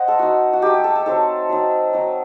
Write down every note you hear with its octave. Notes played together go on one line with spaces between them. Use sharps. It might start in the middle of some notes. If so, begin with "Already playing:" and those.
Already playing: C5 D#5 F#5
A4
A3 D#4 F#4
F#4
A3 D#4 G4
G4
A4
A4
F#3 C4 D#4 A4
F#3 C4 D#4
F#3 C4 D#4